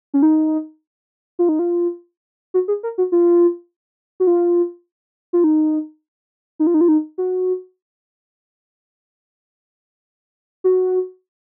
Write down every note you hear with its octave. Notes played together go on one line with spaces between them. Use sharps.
C#4
D#4
F4
D#4
F4
F#4
G#4
A#4
F#4
F4
F#4
F4
F4
D#4
D#4
F4
D#4
F4
D#4
F#4
F#4